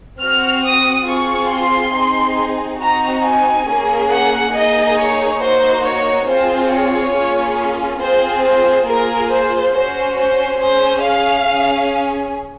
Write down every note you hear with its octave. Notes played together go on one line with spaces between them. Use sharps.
C4 F#4 F6
D#6
C4 F4 G#4 C#6
C6
C4 D#4 G#4
C4 D#4 F#4 A#5
G#5
A#3 C#4 G#4
F#5
A#3 D#4 G#4 D#5
C#5
A#3 D#4 F#4 C5
C#5
C4 F4 G#4 C5
C#5
A#3 C#4 F4 G#4
C4 F4 G#4 C5
C5
A#3 F4 G#4 A#4
C5
C#4 F#4 C5
C5
C#4 G#4 C5
F5
C#4 G#4